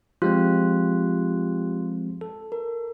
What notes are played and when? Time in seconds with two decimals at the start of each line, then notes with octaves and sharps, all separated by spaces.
0.22 F3 G#3 C4 F4 G4 F#6
2.21 A4
2.52 A#4